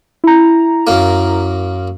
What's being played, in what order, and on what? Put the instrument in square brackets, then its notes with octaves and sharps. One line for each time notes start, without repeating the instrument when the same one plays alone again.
[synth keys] E4 A#5
[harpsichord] F#2 A#3